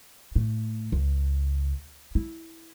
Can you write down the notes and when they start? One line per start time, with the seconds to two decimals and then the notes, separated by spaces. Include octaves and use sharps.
0.36 A2
0.92 C#2
2.15 E4